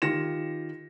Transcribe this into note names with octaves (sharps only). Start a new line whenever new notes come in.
D#3 F4 G4 A#6 C#7 E7